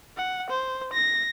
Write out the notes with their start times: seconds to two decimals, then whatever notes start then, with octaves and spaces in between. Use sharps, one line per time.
0.17 F#5
0.50 C5
0.93 A#6